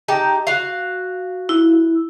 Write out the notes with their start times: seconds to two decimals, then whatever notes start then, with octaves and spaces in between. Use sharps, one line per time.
0.08 D#4 G4 A5
0.47 F#4 F5
1.49 E4